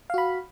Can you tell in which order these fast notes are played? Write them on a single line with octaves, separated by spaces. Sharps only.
F5 F#4 B5